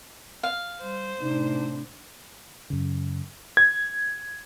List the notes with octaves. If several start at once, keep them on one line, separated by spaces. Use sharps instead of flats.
F5
G3 C5
A2 C3 D4 D#4
F#2 C#3
G#6